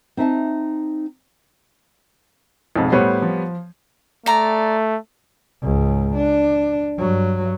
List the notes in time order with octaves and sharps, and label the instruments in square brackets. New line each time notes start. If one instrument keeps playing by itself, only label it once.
[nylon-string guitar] C4 D#4 E5 A5
[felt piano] B1 F2 G#2
[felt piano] A2 C5 [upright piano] G3 B3 C#5
[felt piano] F3
[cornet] A3 [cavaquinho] D5 A#5
[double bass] C#2 G#2
D4
G2 F#3